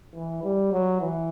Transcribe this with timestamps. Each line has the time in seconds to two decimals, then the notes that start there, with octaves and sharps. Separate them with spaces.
0.15 E3
0.43 G3
0.72 F#3
1.01 E3